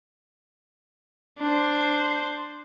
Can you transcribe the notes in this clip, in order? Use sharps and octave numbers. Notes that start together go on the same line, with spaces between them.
D4 C5